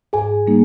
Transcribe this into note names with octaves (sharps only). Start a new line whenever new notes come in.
G#2 G#4 G#5
G3 A#3 D#4